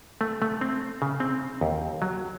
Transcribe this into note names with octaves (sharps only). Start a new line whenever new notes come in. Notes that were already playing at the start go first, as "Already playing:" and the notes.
A3
A3
C4
C#3
C4
D#2
F#3